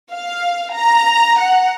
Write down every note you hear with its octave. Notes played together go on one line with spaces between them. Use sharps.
F5
A#5
F#5